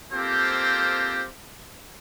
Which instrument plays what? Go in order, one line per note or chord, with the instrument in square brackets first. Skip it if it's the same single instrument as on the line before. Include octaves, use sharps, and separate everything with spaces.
[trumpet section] A#3 C4 F4 G4 A4 C5